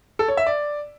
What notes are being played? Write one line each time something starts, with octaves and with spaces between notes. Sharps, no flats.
A4
C#5
E5
D5